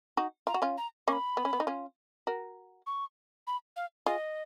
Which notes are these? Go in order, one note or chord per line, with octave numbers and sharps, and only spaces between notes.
D#4 F#4
F4 A#5
F#4
C#4 F4
A#5
A#3 C#4 C#6
B5
B3
C#4
B3
D#4
C#4 F4
F#4 A#4
C#6
B5
F5
F4 G#4 D#5